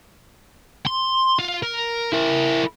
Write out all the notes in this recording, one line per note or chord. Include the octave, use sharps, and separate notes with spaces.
C6
F4
A#4
E4 A#4